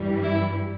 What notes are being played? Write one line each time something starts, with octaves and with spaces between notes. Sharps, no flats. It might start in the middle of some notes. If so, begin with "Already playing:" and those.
Already playing: G2 E3 G3
E4